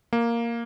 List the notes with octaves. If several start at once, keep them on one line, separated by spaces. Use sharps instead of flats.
A#3